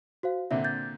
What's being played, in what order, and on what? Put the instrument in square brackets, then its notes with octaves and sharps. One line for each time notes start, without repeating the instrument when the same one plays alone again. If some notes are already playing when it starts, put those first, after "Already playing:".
[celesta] F#4 C5 F5
[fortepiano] A#2 D3 C4 [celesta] E5
[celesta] G6 A6